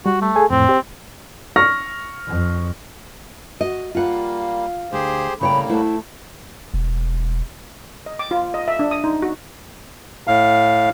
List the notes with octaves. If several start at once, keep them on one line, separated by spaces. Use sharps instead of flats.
G3 F#4
A3
G#4 A4 G#5
F2 A2 C4
G4 C5
C#6 F6 A#6
F2
F#4 D#5
G3 A#3 F4 F5 F#5
D2 G4 G#4 C5
A2 C#3 G3 A#3 C#5 G5 B5
A3 E4 C5 F#5
E1
D#5
D6
F4
D#5
E5
D4
D#6
D#4
F#4
A2 F5